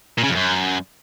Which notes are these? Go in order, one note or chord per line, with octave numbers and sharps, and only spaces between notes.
A#2
C#3
F2
F#2